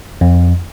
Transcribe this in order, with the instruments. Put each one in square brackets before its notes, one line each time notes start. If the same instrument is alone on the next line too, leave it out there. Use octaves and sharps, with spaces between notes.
[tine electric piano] F2